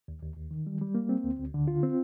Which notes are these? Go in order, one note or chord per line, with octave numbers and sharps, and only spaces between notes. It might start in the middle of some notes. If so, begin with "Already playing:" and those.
D#2
D#2
D#2
D#3
G3
G3
A#3
C4
D2
D2
D3
F4
C4